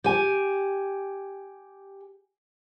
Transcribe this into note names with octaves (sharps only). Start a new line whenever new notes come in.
G4 G#5